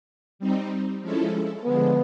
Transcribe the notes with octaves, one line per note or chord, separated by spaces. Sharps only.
G3 C4 D#4
F3 G#3 C#4 E4 A4
D3 F3 G#3 B3